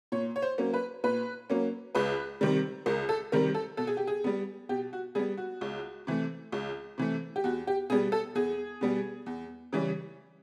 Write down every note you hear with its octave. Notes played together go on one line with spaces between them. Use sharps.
A#2 C#5
C#5
C5
F#3 A#3 C#4
B4
A#2 B4
F#3 A#3 C#4
C#2 B4
C3 D#3 G3
C#2 A#4
A4
C3 D#3 G3 A#4
A4
B2 A4
G#4
G4
G#4
G3 B3
B2 G4
F#4
G3 B3 G#4
F#4
C#2
C3 E3 A3
C#2
C3 E3 A3
G4
E2 F#4
G4
B2 G3 B3 G#4
A4
E2 G#4
B2 G3 B3
E2
C#3 E3 G3